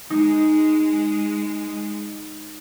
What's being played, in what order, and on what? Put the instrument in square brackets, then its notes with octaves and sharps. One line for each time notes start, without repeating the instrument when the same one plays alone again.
[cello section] G#3 [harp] D#4